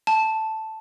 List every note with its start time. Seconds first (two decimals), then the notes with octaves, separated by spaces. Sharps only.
0.07 A5